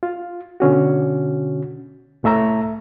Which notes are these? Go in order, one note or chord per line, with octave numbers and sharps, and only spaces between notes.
F4
B2 D3 C#4 F#4
C2 A2 A3 E5 A#5